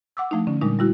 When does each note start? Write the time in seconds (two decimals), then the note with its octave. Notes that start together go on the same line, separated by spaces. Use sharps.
0.17 F#5 D6 E6
0.31 F3 A3 D4 D#4
0.47 D3 C#4
0.61 A#2 G3 G#3 D4 D#4
0.79 G3 E4 F#4